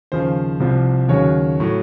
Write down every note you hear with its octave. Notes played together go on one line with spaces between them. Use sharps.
D#2 C#3 F3 C5
C2 C3 F3
D#2 C#3 F#3 C#5
A2 F#3